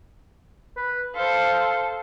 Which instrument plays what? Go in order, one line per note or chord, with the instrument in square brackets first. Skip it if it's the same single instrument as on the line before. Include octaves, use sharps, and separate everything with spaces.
[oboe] B4
[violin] A4 C5 [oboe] F5